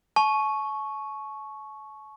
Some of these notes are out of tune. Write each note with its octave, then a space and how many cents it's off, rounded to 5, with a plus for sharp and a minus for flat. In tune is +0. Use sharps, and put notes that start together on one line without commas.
A5 -40 C#6 +0